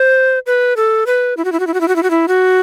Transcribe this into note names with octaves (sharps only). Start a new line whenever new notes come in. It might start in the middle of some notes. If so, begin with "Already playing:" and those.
Already playing: C5
B4
A4
B4
E4
F#4
E4
F#4
E4
F#4
E4
F#4
E4
F#4
E4
F#4